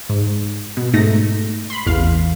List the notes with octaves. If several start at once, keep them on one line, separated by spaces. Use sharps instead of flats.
G#2
B2
G#2 A3 D#4 A#6
B5 C6
A1 E2 F5